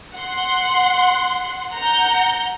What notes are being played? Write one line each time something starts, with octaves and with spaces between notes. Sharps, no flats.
F#5 C6
F#5 A#5 G6